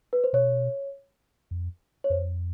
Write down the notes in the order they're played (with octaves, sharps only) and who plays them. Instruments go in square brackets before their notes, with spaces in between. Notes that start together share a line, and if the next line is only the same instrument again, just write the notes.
[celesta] B4
C5
[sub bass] B2 [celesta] C#5
[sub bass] F2
[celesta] C#5
[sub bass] F2 [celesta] C5